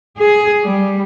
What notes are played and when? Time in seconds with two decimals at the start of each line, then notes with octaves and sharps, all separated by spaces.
0.19 G#4
0.62 G3